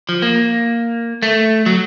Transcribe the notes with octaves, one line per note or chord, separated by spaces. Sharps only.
F3
A#3
A3
F#3